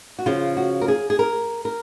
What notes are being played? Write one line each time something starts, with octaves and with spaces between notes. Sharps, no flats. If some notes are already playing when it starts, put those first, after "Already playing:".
F#4
C#3 F3 F4
F#4
A#4
G#4
G#4
A#4
A#4